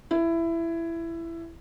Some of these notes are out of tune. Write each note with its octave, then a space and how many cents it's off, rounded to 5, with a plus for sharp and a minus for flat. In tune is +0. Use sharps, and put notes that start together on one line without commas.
E4 +15